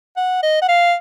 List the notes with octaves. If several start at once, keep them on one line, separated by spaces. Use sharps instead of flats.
F#5
D#5
F#5
F5